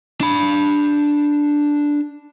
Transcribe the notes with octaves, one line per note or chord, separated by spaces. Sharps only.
D4 B5